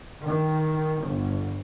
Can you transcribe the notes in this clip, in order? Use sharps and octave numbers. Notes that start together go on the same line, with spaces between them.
D#3
G1